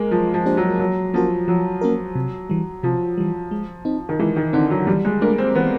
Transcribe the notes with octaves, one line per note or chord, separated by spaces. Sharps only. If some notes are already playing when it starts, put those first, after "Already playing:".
Already playing: G#3 A#3
F3 F#3
F3
A#3 D4 G4 C5
F#3
F3 F#3
F3 A#3 C#4 F#4 A#4
F3 F#3
A#3 C#4 F#4 A#4
C3
E3 G3
C3 F3
E3 G3
G#3
C4 D#4
D#3
E3 G#3
D#3
D3 C4 D#4
F#3
E3 G3
G#3
A3 A#3 D4
C4
E3 B3